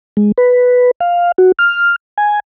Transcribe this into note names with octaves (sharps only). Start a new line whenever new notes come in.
G#3
B4
F5
F#4
F6
G#5